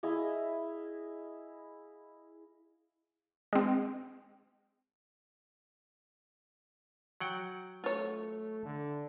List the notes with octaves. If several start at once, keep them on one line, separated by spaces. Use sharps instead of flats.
E4 G#4 D#5 F5
G#3 C4
F#3 F#5 G5
A3 F4 C#5
D3